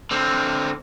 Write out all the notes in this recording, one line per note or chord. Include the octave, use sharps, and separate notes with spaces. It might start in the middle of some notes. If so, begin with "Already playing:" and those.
D3 C4